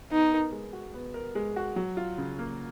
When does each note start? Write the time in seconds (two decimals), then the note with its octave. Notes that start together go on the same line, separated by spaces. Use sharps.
0.11 B3 D#4
0.32 A#4
0.52 G#3
0.73 F#4
0.94 B3
1.14 A#4
1.35 G#3
1.56 F#4
1.76 F#3
1.97 F4
2.18 C#3
2.39 A#3